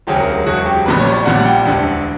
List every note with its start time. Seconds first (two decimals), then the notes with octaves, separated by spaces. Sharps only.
0.07 E1 D2 C#3 F#3 G4
0.20 A#4
0.46 E1 D2 C#3 F#3 F#4
0.66 G4
0.86 A#1 A#2 G3 B4
0.99 C#5
1.12 D5
1.25 A#1 A#2 G3 F#5
1.39 F#5
1.45 G5
1.65 E1 D2 D3